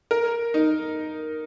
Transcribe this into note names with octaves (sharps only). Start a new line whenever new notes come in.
A#4
D#4